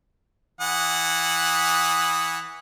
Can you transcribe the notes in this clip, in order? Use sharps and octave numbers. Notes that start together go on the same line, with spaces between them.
E3 F#5 D#6